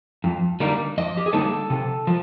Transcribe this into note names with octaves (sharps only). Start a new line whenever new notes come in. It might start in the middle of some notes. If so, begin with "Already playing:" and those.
F2
D3 G3 A#3 D#4
F2 D#5
G4
G#4
D3 G3 A#3 D#4 A4
C3
F3